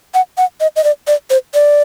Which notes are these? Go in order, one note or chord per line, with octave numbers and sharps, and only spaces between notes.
F#5
F#5
D#5
D#5
D5
D5
C5
D5